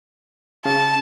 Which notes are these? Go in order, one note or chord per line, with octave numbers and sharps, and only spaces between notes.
C#3 A5